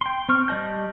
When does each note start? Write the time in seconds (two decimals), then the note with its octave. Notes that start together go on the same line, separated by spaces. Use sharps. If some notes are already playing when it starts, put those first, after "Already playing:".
0.01 G5 C6
0.29 C4 C#6 F6
0.48 G3 D5 D#5 A5 G6